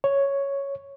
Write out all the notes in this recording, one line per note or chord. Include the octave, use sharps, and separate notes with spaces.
C#5